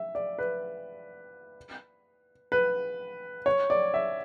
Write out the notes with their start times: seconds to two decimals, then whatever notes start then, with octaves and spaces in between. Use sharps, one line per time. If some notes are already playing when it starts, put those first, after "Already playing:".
Already playing: E5
0.15 D5
0.39 B4
2.52 B4
3.46 C#5
3.70 D5
3.94 E5